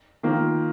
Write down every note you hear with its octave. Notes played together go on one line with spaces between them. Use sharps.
D#3 A#3 F4